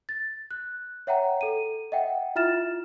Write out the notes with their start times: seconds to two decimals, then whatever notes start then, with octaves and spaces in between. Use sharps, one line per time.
0.09 A6
0.51 F#6
1.07 C#5 E5 F#5 G5 A#5
1.41 A4 D#7
1.92 D#5 E5 F#5 G5
2.36 E4 F4 E5 F6 A6 E7